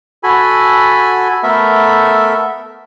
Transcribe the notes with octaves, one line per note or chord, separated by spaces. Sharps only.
F#4 A4 G#5 B5
A3 B3 A4 A#4 E5